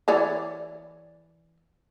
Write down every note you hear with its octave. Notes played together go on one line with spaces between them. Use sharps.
E3 C#5 D5